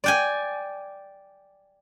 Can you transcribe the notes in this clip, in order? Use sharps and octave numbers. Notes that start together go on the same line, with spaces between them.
D5 G5 G#5